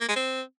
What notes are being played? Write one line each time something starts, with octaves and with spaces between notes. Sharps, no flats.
A#3
G#3
C4